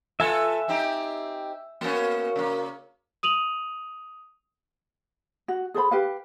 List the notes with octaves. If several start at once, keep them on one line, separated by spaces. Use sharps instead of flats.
F4 A4 B4 E5 G#5
C4 D#4 G4
A#3 B3 C#4 F#4 A#4 F5
C#3 A#3
D#6 D#7 F7 F#7
F#4
G#4 A4 C5 B5
G4 B4 F5